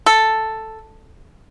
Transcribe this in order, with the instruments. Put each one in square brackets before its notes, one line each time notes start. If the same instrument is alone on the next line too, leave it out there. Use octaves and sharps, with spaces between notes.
[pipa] A4